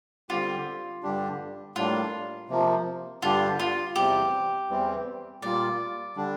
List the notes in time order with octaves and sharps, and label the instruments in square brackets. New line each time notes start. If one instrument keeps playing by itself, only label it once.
[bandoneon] D3 G3 C4 G4 [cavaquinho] F4
[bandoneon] G2 D3 G3 D4 G4
[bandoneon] A2 G3 A#3 D4 [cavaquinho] F4
[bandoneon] C3 F3 A#3
[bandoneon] G2 D3 G3 D4 G4 [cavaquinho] F4
[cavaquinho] F4
[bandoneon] E2 C3 G3 C4 [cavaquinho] G4
[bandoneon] E2 E3 G3 C4
[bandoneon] A#2 G3 A#3 F4 [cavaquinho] D5
[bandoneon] D3 G3 D4